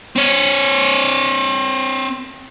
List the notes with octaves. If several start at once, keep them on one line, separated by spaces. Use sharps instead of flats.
C4 C#5